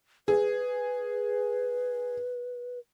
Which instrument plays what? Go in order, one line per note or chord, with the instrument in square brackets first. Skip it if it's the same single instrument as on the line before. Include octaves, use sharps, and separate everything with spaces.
[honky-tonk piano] G#4 [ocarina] B4